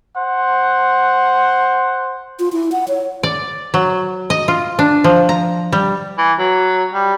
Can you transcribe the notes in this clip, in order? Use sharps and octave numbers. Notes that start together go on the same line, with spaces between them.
C5 F#5
F4
E4
F#5
C#5
D5
F#3
D#5
F4
D4
F3
A#5
G3
E3
F#3
G3